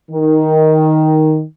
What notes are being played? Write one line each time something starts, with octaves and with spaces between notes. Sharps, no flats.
D#3